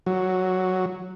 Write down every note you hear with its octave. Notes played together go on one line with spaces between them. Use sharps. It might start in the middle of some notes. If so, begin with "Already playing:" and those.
F#3